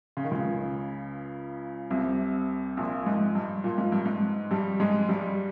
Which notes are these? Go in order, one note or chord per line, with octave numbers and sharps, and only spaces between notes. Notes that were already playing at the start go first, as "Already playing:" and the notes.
C#3
D#3
C#2 C#3
C2 C3
A#1 A#2
G#2
G2
A#2
G#2
G2
G#2
G2 G3
G#2 G#3
G2 G3